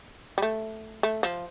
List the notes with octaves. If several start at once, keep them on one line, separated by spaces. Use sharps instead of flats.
G3
A3
A3
F3